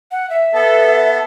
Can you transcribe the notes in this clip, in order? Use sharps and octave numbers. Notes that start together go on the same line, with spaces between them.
F#5
E5
B3 A4